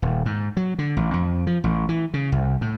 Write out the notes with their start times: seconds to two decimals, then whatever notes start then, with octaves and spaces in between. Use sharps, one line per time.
0.02 D#1
0.26 G#2
0.57 F#3
0.79 D3
0.97 A1
1.14 F2
1.47 F3
1.64 A1
1.89 E3
2.14 C#3
2.32 C2
2.61 A2